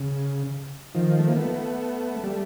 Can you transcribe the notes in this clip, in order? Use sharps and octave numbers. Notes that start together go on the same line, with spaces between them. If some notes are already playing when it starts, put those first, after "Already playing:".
Already playing: C#3
D#3 F3
A3
A#3
A3 B3
G3 A3